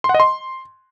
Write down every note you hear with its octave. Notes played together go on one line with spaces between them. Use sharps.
C6
F#5
D#5
C6